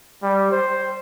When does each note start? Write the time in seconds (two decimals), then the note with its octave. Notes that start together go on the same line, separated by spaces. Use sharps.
0.23 G3
0.52 C5